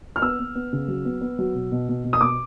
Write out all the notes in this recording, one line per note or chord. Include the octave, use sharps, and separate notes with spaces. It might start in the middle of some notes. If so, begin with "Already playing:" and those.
F6
B3 E6
B3
B3
C#3
F#3
B3
B3
F#3
B2
B2
B2
B2
D#6
B2 D6